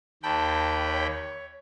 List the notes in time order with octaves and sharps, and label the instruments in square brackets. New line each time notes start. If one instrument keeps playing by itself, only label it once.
[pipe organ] D#2 G5 B5 [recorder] A5
[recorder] C#5